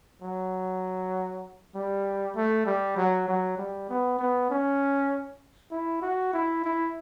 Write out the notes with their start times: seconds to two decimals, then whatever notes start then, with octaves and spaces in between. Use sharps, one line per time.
0.22 F#3
1.75 G3
2.35 A3
2.66 G3
2.96 F#3
3.28 F#3
3.57 G3
3.89 B3
4.19 B3
4.50 C#4
5.71 E4
6.02 F#4
6.33 E4
6.64 E4